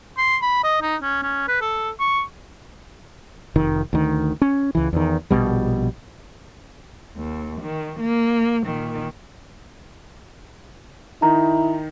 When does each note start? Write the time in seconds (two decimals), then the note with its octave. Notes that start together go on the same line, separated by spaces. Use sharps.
0.18 C6
0.42 B5
0.64 D#5
0.82 D#4
1.02 C#4
1.23 C#4
1.48 B4
1.61 A4
2.00 C#6
3.56 F1 D#3
3.93 D2 D#3
4.42 C#4
4.75 C#2 E3
4.93 E2 D#3
5.31 A#1 B2 G3
7.16 D#2
7.62 D#3
8.00 A#3
8.63 A#2 D#3
11.22 D#3 D#4 E4 A#5